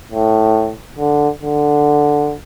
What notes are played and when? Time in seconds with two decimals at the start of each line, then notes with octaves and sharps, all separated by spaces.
0.12 A2
0.98 D3
1.42 D3